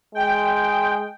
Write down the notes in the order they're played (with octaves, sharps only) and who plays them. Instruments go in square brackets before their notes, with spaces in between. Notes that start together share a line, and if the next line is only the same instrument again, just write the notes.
[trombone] G#3 [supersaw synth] G5